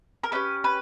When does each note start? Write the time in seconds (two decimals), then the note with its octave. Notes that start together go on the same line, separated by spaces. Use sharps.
0.23 A#4
0.32 C#4 G4 B4
0.64 B4